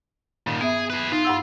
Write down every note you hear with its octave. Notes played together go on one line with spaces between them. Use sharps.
G2 A#2 D#3
B3 G#4 E5
G#4 B4
D#4 F4
G2 F#5 E6